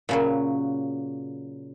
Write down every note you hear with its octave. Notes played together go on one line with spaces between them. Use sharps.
A#2 C#3 F#3